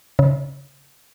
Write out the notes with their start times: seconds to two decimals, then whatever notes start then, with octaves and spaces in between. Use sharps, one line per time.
0.19 C#3